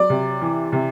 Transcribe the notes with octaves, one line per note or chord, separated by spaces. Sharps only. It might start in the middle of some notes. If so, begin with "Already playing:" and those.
Already playing: F#3 D5
C3
E3
C3